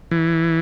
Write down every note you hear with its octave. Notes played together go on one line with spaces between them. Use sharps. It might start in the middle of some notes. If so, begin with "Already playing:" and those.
E3